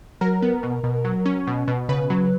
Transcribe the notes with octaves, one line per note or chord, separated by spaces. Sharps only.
F#3 A#4
B3
B2
B2
F#3
C#4
B2
B2
C#3 B4
F#3